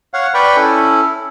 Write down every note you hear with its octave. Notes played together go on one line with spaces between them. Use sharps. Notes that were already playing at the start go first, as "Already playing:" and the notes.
C#5 F5 F#5
B4 D5 G5 B5 C#6
C#4 E4 A4